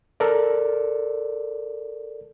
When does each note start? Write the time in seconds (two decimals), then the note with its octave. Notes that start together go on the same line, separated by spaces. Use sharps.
0.20 A4 A#4 D5